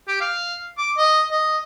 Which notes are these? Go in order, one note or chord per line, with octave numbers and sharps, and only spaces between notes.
G4
F5
D6
D#5
D#5